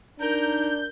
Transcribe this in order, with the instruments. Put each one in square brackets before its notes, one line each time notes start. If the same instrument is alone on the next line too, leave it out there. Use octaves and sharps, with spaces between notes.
[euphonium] D4 [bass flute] D#4 [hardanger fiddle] A#4 [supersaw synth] G6